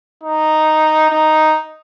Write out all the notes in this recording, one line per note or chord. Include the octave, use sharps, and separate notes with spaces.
D#4
D#4